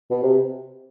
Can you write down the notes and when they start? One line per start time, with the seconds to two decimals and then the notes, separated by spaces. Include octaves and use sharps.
0.10 B2
0.23 C3